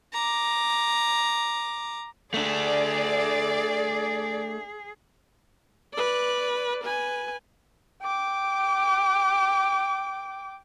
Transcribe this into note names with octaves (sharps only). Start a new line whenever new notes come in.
A#5 D6
A3 D4 G#4 D5
B4 D5
B4 G#5
G5 D6